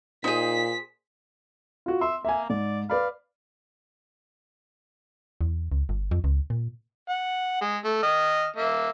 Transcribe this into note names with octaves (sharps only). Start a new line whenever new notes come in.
A#2 D#4 G#4 C5 B6
F4 F#4
E5 C6
A#3 E5 G#5
G#2 D5
B4 D5 F5 B5
E2
C#2
G1
F2
C#2
A#2
F#5
G#3
A3
D#5 F6
A#3 E5